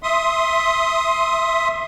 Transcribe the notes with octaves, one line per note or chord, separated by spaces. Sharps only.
E5 C6 D#6